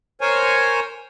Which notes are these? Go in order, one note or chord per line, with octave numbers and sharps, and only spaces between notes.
A#4 C5 C#5 G#5